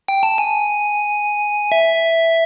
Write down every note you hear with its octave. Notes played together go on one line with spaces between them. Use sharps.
G5
A5
G#5
E5